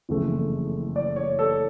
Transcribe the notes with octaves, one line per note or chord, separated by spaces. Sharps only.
F#1 F2 C#3 E3 A3
D5
C#5
A4